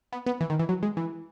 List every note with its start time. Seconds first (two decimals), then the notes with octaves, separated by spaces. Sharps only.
0.13 B3
0.26 B3
0.41 E3
0.50 D#3
0.59 E3
0.69 F#3
0.83 G#3
0.97 E3